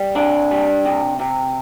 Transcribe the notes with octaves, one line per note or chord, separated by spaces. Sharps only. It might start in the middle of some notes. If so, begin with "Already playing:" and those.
Already playing: G3
C3 D4 D5
G3
C3
C3